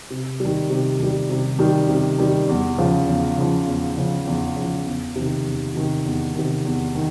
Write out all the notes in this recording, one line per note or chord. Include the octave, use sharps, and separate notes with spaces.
C3
D#3 G3
C3
D#3 G3
C3
D#3 G3
C3
D#3 G3
E2
C#3 F3
E2
C#3 F3
E2
C#3 F3
E2
C#3 F3
E2
C3
D#3
E2
C3 D#3
E2
C3 D#3
E2
D#3